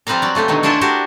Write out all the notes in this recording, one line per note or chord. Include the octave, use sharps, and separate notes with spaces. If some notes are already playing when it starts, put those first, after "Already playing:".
F3 G3 C4 B4 F5 A#5
F#3 D5
C#3 A3 F4 G4
B2 D3 D#3 F#3
C#4 D4 E4 F4 C5 C#5
D4 F#4 G4 A#4 D5